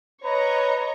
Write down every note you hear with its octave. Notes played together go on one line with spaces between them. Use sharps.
B4 C#5 D#5 A#5